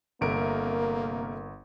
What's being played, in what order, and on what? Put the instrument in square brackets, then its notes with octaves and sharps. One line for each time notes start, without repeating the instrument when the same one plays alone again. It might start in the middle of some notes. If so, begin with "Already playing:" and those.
[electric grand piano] G1 D7 [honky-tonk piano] C3 A3 A#4 [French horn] A#3